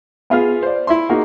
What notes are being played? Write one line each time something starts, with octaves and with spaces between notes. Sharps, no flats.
B3 F4 G#4 F6
C5 D5
E4 E5 C6
A#3 D#4 F#4 G#4